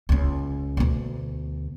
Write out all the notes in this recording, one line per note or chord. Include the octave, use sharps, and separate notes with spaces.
C#2 C#4
D2 B2